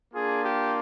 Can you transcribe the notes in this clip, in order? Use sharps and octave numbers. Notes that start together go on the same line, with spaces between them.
A#3 D4 F4 G#4
G4